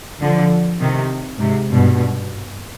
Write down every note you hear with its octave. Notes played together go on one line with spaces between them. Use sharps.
D3 F3
C3 D#3
G#2 C3
G2 B2